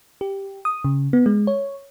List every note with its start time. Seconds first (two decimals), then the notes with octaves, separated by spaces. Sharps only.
0.21 G4
0.65 D#6
0.85 C#3
1.13 B3
1.26 G#3
1.47 C#5